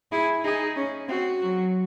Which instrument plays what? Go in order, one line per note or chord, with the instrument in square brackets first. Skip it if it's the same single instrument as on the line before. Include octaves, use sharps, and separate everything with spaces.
[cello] E4 [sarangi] G#4
[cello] D#4 [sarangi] G#4
[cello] C#4
[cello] C4 [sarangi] F#4
[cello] F#3